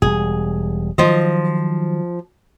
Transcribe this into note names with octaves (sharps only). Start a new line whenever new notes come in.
E1 G3 G#4
D#3 F3 F#3 C5 D#5